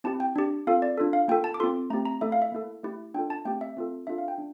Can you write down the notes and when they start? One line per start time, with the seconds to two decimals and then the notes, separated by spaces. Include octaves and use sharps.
0.04 C4 E4 G4 A5
0.20 G5
0.36 D4 G4
0.67 C4 F4 A4 F5
0.82 D5
0.98 D4 F4 A4
1.13 F5
1.28 A#3 F4 A4 G5
1.44 A5
1.54 D6
1.60 C4 F4 A4 C6
1.90 A3 A#5
1.93 C4 G4
2.05 A#5
2.21 A3 E4 A4 E5
2.32 F5
2.42 E5
2.52 A#3 E4 A4
2.83 A3 E4 G4
3.14 D4 F4 A4 G5
3.30 A5
3.45 A3 C4 G4 G5
3.61 E5
3.77 C4 F4 A4
4.07 D4 F4 A4 E5
4.18 F5
4.28 G5
4.38 D4